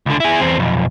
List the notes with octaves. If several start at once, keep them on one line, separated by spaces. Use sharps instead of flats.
C#2 D3
E4 G#4
E2 C4
B1 F2